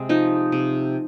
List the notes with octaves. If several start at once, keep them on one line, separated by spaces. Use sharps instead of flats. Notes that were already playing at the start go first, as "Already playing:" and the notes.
Already playing: C3 G#3
F3 D#4
C3